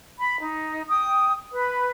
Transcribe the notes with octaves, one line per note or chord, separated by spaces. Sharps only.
B5
D#4
G5 D#6
B4 B5